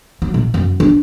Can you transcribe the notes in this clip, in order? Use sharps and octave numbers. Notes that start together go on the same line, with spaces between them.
F#3
A#2
F#2
D4